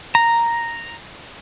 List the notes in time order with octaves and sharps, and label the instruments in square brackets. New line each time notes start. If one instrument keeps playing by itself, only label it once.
[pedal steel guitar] A#5